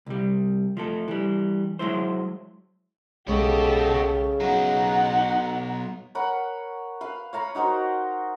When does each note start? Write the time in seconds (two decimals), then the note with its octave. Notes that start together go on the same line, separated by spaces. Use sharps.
0.06 C2 G3
0.77 F3 A3 A4
1.08 E3 G3
1.79 F#3 G#3 E4 C5
3.28 B1 C#3 G#3 B3 G4 A4 D#5 C#6
4.41 F#3 B3 D#4 F#5 A#5
6.15 A#4 C#5 F#5 B5
7.01 B4 F5
7.33 C#5 F5 A#5 B5
7.55 D#4 F#4 A#4 C5